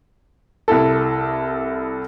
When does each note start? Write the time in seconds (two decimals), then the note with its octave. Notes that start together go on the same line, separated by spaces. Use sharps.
0.68 C2 E4 A4